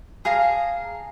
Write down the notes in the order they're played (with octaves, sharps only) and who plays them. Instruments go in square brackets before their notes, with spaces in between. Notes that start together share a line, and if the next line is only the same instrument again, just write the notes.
[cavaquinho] G#4 F5 A5 A#5